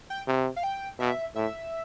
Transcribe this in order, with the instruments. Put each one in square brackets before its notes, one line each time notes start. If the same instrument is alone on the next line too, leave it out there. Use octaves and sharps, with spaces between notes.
[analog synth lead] G5
[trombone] C3
[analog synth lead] F5
G5
[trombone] B2 [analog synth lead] E5
[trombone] A2 [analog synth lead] E5